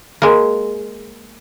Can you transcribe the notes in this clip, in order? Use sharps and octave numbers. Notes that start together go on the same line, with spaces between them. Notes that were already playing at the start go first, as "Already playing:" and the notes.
G#3 A#3